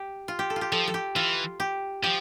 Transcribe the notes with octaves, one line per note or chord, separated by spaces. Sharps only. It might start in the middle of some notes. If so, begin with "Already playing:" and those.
Already playing: G4
F4
G4
A4
F4
G4
F3 A4
A4
G4
E3 F4
G4
F3 G4